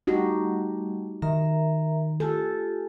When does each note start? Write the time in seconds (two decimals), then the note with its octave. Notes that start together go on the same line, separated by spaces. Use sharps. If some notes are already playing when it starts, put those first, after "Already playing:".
0.07 G3 A3 D#4 F#4 G4
1.22 D#3 A#4 E5 A#5
2.20 F4 G4 A4 G#5